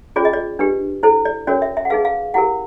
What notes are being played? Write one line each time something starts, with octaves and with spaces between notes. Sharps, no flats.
C#4 F4 G#4 C5 D5
D#5
D5
D4 G4 B4
E4 A4 C5
D5
C#4 F#4 A#4 C#5 D5
E5
E5
F#5
D#4 G#4 B4 F5
F5
E4 G4 A#4 F#5